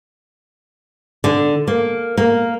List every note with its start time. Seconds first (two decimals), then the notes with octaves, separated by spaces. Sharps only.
1.24 D3
1.67 A#3
2.17 A#3